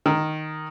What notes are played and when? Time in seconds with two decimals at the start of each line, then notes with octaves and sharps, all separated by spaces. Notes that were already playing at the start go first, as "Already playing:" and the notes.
0.06 D#3